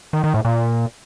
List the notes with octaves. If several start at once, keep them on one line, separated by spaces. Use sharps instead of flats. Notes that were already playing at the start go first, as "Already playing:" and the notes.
D#3
D#3
A2
A#2